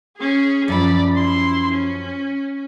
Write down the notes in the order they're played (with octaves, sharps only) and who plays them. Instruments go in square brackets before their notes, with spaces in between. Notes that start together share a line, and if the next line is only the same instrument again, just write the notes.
[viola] C#4 G#4
[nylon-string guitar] F#2 F3 [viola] D5 B5
[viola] E4 C6
C#4